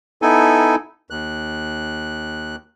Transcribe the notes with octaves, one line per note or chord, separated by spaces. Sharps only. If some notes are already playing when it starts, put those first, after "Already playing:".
B3 D#4 E4 A4 G#5
D#2 F#6